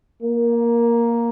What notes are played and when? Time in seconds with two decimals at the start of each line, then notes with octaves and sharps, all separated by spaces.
0.22 A#3